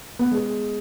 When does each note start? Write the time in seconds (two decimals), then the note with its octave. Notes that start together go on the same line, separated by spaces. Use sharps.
0.19 B3
0.31 G#3